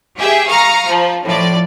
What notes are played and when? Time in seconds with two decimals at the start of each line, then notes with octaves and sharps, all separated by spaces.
0.17 G4 G#4 E5 G5
0.48 F5 A#5 C#6 D#6 F6
0.87 F3
1.23 A2 F3 D5